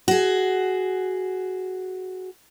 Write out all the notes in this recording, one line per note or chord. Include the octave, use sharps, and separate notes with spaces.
F#4 G#4